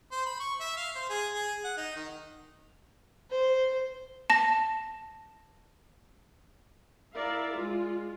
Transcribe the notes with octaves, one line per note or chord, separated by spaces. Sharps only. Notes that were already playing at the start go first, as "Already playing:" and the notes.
C5
B5
C#6
E5
F5
C5
G#4
G#4
F#5
D#4
D#3
C5
A5 A#6
E4 A#4 D5 E5 F5
G#3 F4